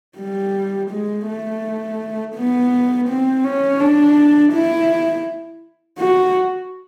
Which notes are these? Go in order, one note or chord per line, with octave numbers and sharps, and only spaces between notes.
G3
G#3
A3
B3
C4
C#4
D4
E4
F#4